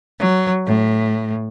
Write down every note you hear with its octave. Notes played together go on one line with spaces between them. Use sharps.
F#3
A2